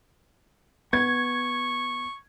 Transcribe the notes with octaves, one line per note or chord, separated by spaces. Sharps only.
B3 C#6 G#6